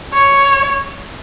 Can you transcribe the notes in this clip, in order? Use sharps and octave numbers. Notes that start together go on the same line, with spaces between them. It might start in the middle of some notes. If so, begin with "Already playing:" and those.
C#5